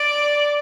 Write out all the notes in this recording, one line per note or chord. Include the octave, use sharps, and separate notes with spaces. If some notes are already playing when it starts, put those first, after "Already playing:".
Already playing: D5